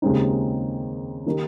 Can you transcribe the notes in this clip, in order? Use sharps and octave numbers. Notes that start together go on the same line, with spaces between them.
D#2 C#3 G#3 C4 D#4
D#3 A#3 D#4 G4